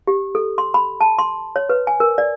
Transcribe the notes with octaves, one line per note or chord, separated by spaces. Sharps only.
G4
A4
C6
B5
A5
C6
C#5
B4
G#5
A#4
D5